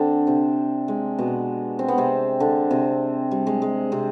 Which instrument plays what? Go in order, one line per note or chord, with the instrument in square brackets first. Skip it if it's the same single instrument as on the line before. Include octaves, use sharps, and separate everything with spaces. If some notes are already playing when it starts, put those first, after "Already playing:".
Already playing: [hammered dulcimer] D3 C4 D4
C3 C4
G#3
B2 B3
C4
B3
C3 C4
D3 D4
C3 C4
G3
G#3
G#3
C3 C4